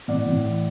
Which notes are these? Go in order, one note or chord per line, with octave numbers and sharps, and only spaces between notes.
A2 D5 F#5
A2
E3